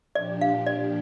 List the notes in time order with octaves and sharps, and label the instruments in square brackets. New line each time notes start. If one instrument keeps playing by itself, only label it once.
[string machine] A#2 F3 D4 G4 [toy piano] D5
[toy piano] F5
D5